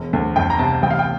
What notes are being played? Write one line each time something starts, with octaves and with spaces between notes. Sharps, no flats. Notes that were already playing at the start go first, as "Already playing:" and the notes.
Already playing: E1
D2
F2 G5
A#5
C3 A5
A1 G5
F5
G5